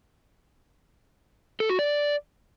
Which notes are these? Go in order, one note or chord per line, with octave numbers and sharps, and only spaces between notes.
A4
F#4
D5